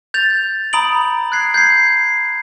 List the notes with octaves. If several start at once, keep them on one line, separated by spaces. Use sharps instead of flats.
G6 A6 F7
A#5 B5 D#6 D7 F#7
F#6 G#6 C7
G6 G#6 C7